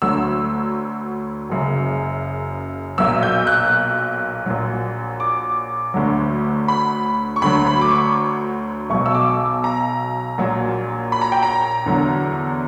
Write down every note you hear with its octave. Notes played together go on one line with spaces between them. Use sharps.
D2 D3 F#3 E6
F#1 F#2 C#3
B1 A#2 F#3 E6
G6
F#6
A#1 A#2 F#3
D6
D2 D3 F#3
B5
C#6
D2 D3 F#3 B5
B5
D6
C#6
B1 B2 F#3 C#6
E6
D6
A#5
A#1 A#2 F#3
B5
A#5
G5
A#5
E2 D3 F#3